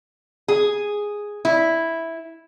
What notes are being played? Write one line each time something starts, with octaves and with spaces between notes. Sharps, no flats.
G#4
E4